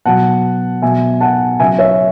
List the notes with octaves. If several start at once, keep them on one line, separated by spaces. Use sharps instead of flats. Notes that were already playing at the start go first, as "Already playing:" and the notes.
B2 F#3 F#5 A5
B2 F#3 E5 G#5
F#5 A5
C#3 F#3 E5 G#5
C#5 E5